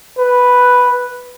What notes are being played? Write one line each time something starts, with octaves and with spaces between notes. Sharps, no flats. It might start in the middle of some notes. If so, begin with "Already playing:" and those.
B4